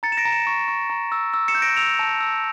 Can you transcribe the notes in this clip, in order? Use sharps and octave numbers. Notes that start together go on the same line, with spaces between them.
A#5 A6 C#7
E7
A#6 D7
A#5
C#7 E7
C#6
C#6
A#5
E6
E6
C#7 E7
G6
A#6 D7
E6 D7 F7
A5
E6